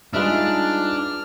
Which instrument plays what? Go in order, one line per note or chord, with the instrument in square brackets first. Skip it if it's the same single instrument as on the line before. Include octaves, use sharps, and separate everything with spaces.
[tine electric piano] G3 D#4 F4 [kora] G#3 B4 E5 [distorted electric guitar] D4 [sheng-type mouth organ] F6